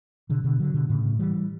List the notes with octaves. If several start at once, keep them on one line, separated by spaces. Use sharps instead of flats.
B2 D3
B2 D3
D3 F#3
B2 D3
A2 C#3
E3 G3